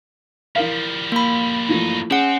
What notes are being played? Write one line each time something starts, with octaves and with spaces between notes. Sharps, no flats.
E3 F3 G3 A#4 F5
A#3 B5
G2 E3 F3 A3 D#4
C4 C#4 G#4 F#5